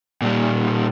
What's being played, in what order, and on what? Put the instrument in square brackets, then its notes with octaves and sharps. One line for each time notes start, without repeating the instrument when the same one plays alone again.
[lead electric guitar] A#2 G3